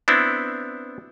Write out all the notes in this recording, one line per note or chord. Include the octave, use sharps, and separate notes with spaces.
B3 C4 D4 E4